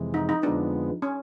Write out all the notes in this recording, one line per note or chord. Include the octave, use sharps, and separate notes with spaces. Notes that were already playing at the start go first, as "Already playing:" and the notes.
Already playing: F2 C3 E3 G#3
D#4
D#4
F2 D3 F3 G#3 B3 D4
C#4